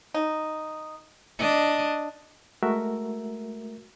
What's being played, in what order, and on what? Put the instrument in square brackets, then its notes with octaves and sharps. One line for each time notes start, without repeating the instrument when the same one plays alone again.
[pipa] D#4
[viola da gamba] D4 D#5
[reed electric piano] G#3 A3 F#4 A#4 E5